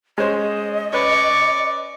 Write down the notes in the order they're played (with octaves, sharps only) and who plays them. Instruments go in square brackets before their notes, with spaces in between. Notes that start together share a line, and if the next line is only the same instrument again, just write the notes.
[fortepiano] G#3 C#4 C5 [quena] D#5
[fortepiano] C#4 B4 [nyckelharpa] D5 C#6